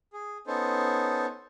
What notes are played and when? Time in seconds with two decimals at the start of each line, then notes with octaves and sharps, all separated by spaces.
0.13 G#4
0.47 B3 C#4 D#4 A4 C5